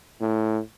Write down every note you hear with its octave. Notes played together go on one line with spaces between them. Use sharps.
A2